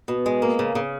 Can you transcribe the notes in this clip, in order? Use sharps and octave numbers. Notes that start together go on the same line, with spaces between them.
B2
G#3
A#3
C#3
C#3